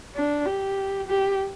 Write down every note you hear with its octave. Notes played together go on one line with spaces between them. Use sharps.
D4
G4
G4